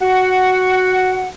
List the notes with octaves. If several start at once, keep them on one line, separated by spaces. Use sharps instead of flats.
F#4 F#5